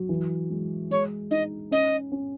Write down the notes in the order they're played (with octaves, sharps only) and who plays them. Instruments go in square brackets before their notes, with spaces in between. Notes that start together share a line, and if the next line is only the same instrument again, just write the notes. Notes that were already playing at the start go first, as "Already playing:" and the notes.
Already playing: [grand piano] F#3
E3
G#3
[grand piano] G#3 [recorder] C#5
[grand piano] D#4 [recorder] D#5
[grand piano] C#4 [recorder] D#5
[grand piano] C#4